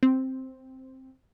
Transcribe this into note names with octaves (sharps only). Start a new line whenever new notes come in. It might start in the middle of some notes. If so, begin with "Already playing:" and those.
C4